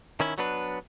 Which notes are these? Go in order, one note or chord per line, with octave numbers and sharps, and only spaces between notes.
D#3 C#4 E4
F#3 B3 D4 B4